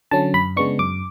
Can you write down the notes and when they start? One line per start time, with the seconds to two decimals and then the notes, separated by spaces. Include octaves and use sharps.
0.11 D3 F#3 C#4 A5
0.34 F#2 B5
0.57 C#3 G#3 B3 D4 C#6
0.79 F#2 D6